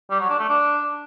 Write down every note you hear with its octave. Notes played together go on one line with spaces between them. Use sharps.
G3
F#3
D4
A3
D4